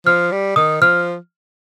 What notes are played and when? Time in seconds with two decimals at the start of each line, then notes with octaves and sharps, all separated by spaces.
0.06 F3 F6
0.32 G3
0.56 D#3 D#6
0.81 F3 F6